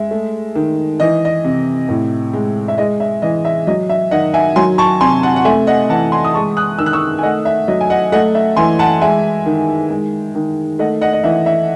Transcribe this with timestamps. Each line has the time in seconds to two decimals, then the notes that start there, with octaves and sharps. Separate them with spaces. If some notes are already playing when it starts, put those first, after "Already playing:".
Already playing: G#3 E5
0.11 A3
0.55 D#3
1.00 E3 D#5
1.25 D#5
1.44 C3
1.89 A2
2.33 G#3
2.68 E5
2.78 G#3 D#5
3.00 E5
3.22 E3 D#5
3.45 E5
3.67 F#3 D#5
3.89 E5
4.11 D#3 D#5 F#5
4.34 E5 G#5
4.56 F#3 G#5 C6
4.78 A5 C#6
5.01 C3 G#5 C6
5.23 F#5 A5
5.36 F#5
5.45 A3 E5 G#5
5.67 D#5 F#5
5.89 E3 F#5 A5
6.12 G#5 C6
6.25 D#6
6.34 G#3 A5 C#6
6.57 D#6 F#6
6.79 D#3 E6
6.86 F#6
6.93 C#6 E6
7.18 G#5
7.23 A3 D#5 F#5
7.45 E5
7.68 F#3 D#5
7.81 G#5
7.90 D#5 F#5
8.12 A3 D#5 F#5
8.35 E5
8.57 E3 G#5 C6
8.79 F#5 A5
9.01 G#3 E5 G#5
9.46 D#3
9.90 G#3
10.35 D#3
10.79 A3 D#5 F#5
11.01 D#5 F#5
11.13 D#5
11.23 E3 E5
11.46 E5